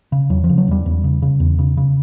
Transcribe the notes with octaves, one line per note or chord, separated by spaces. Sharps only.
C#3
E2 F#3
F3
C#3
F#3
E2 G3
E2
C#3
C#3
E2
C#3
C#3